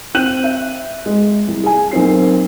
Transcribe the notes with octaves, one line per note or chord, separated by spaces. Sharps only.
C4 G5 F#6 G6 D#7 F#7
E5
G#3
C2
G#4 G#5
B1 A#3 C4 C7